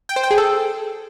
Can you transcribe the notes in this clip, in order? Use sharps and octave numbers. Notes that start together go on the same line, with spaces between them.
G5
C5
G5
G#4
A4